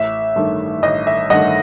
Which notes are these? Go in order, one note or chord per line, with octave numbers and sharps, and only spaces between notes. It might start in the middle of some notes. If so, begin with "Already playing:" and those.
Already playing: A1 E5
G2 D#3 A3
A1 D#5
E5
G2 D#3 A3 D#5 F#5